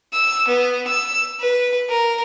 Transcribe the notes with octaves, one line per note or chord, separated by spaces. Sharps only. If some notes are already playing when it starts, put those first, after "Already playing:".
E6
B3
E6
B4
A#4